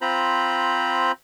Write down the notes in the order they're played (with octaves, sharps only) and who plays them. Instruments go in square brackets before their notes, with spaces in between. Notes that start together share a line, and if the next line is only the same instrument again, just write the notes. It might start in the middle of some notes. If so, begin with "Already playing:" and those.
[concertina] C4 F4 C5 A#5 B5